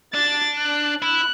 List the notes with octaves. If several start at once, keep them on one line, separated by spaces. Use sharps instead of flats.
D4 A6
F#6
E4 F#6